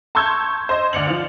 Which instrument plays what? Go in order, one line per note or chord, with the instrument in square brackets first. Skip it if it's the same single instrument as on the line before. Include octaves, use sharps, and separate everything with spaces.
[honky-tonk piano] A5 C6 C#6 E6 G6 G#6
C5 D#5
D2 D5 C#7 F7 F#7
F3 F4